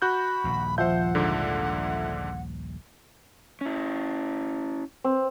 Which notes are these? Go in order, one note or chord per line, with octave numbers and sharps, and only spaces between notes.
F#4 B5 F#6 G6
D#1 A#1 D#2
F3 C5 E5 F#5 G6
G#2 D3
C#4 E4
C4